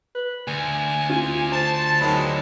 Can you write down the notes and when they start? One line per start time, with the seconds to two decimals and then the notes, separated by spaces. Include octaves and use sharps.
0.15 B4
0.48 D2 G#5
1.10 F4
1.52 C5 A5
2.01 D#3 F#3 G#3 A#3 B5